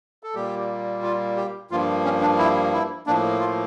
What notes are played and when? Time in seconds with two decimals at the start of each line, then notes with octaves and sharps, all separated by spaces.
0.23 A4
0.35 A#2 G3 A#3 G4
1.03 F4
1.36 G4
1.71 G2 F3 A#3 F4
2.05 C#4
2.21 D4
2.38 E4
2.73 E4
3.07 A2 F3 A#3 D4
3.40 F4